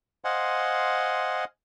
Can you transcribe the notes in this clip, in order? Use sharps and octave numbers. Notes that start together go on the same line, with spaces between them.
C5 D#5 F5 F#5 G#5 C6